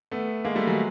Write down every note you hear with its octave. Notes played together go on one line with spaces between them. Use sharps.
A3 B3
G#3 A#3
G3 A3
F#3 G#3